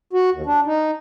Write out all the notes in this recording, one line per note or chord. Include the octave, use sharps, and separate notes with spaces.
F#4
D#2
D4
D#4